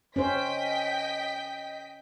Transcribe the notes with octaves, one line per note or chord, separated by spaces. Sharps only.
C#4 C5 D#5 G5 B6